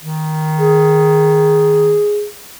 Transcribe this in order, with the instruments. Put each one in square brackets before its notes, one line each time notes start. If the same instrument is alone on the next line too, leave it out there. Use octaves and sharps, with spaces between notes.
[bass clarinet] D#3
[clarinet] G#4